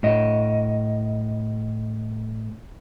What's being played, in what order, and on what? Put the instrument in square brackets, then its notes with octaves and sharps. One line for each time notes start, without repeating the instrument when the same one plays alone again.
[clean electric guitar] A2 D#5